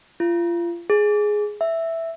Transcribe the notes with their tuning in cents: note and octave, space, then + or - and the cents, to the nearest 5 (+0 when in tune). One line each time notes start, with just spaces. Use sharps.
F4 -30
G#4 +5
E5 +0